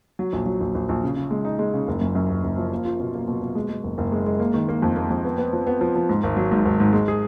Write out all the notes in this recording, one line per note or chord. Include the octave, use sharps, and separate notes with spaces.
F#3
A#1
F#3
A#1
A#1
A#1
C#3
C#3
G#3
D#4
G#3
C#3
F#1
F#2
F#2
F#1
F#1
F3
A#3
F4
B2
A#3
B2
B2
G#3
G#3
F#1
F#1
G#3
G#3
A#3
D#3
A#3
F2
A#3
F2
B3
B3
F3
B3
F3
F3
G#2
G#1
F#3
G#2
G#1
G#2
G#3
G#4